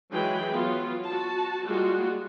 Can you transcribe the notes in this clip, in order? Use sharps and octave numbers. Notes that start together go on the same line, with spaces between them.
E3 F#3 G#3 G#4 G5 B5
F#3 B3 F4
F#4 A5
G3 G#3 A#3 F4 F#4